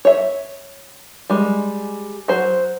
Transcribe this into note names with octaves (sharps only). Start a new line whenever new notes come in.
C#5 E5
G3 G#3
F#3 F#4 C5